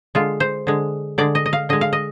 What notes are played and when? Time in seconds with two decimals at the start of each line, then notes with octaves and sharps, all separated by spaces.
0.15 D3 G#3 F4
0.40 C5
0.67 D3 G#3
1.18 D3 G#3 D5
1.35 D#5
1.46 D#5
1.53 F5
1.69 D3 G#3 D#5
1.81 F5
1.93 D#5